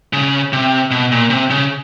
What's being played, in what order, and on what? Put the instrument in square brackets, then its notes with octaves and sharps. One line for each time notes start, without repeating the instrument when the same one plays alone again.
[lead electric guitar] C#3
C3
B2
A#2
C3
C#3